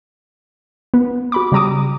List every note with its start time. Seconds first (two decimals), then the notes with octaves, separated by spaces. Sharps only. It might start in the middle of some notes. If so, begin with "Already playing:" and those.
0.94 B3
1.32 F#4 B5 D6
1.52 C#3 G3 A#5 D6 D#6